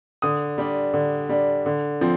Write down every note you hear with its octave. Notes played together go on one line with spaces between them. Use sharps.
D3 D#6
G3 D4
D3
G3 D4
D3
F3 C4